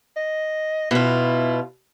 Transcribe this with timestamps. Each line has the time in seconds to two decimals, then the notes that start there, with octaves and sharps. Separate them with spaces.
0.17 D#5
0.91 B2 E4 F4